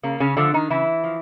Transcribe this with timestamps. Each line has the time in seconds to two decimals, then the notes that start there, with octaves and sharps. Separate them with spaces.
0.03 C#3 A#3
0.20 C#3 C#4
0.37 D3 F3 A3 D4
0.54 D#3 D#4
0.70 C#3 E3 E4
1.04 F3